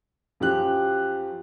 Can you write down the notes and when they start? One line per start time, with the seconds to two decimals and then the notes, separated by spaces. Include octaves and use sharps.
0.40 F#2 F3 G4 F#6